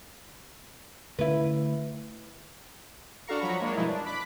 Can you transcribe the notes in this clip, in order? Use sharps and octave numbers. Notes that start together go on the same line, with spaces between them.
D3 A3 C#4 E4 B4
D4 F#4 A4 F5 A#5 C#6
F3 F#3 A#5 B5 C#6
G#3 A#3 D4 C#5
G2 B2 F3 G#3 D#4 E4
D4
B5 D6 F#6 B6